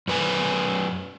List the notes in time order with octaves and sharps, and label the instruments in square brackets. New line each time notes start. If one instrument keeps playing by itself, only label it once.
[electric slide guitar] F#2 B4 G#5